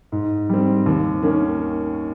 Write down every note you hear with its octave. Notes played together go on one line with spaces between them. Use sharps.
G#2
G3 C4
D#2
D#3 A#3 C#4